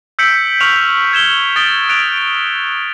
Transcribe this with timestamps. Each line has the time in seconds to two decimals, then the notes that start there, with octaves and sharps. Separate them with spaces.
0.19 E6 G6 B6 C#7 D7 F#7
0.60 C#6 F6 F7 F#7
1.12 E6 G#6 E7 G7
1.56 D#6 A6 D7 G7
1.89 F#6 A6 D7 F7
2.18 D7